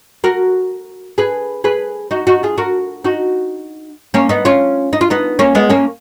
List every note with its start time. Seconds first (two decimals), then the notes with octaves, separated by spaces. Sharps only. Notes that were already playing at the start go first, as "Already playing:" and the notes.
0.24 F#4 A#4
1.18 G#4 B4
1.64 G#4 B4
2.11 D#4 F#4
2.27 D#4 F#4
2.43 F4 G#4
2.58 F#4 A#4
3.04 D#4 F#4
4.14 A#3 C#4
4.29 B3 D#4
4.45 C#4 F4
4.93 D#4
5.01 F4
5.10 B3 D#4
5.39 A#3 C#4
5.55 G#3 B3
5.70 A#3 C#4